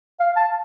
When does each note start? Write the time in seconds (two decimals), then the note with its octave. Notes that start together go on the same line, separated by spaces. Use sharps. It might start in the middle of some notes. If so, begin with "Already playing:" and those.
0.20 F5
0.36 A5